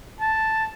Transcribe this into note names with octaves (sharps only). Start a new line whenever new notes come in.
A5